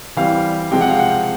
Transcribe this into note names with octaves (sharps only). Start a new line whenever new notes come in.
E3 G3 C4 F5
C3 F3 G#3 C4 G5
F#5
F5
F#5